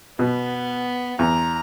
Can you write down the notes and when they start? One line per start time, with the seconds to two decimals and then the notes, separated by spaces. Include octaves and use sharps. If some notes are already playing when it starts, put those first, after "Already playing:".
0.19 B2 B3
1.19 E2 A#5